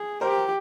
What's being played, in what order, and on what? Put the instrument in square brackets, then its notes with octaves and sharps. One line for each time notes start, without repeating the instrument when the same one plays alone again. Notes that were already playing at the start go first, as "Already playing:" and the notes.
Already playing: [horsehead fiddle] G#4
[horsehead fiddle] G4 [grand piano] A#4 C5